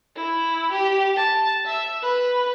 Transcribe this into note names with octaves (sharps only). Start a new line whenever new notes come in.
E4
G4
A5
E5
B4